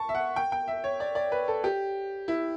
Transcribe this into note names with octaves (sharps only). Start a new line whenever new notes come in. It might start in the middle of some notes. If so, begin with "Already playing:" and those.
Already playing: A5 C#6
E5
F#5
G5
G5
E5
C#5
D5
D5
B4
A4
G4
E4